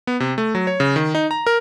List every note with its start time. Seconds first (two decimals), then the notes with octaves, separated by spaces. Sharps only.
0.07 B3
0.20 C3
0.38 A3
0.55 F#3
0.67 C#5
0.80 C#3
0.96 D#3
1.15 D#4
1.31 A#5
1.47 A#4